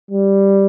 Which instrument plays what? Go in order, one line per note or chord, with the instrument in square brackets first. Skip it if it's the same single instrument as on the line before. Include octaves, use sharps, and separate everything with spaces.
[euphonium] G3